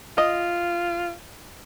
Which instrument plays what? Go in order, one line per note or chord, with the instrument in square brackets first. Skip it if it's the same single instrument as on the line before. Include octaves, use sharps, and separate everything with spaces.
[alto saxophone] F4 [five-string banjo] D#5